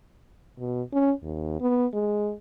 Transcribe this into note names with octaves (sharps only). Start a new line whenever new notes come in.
B2
C#4
D#2
B3
G#3